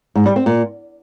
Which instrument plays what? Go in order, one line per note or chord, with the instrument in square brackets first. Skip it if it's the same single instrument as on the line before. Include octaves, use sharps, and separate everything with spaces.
[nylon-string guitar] G#2
G3
C4
A#2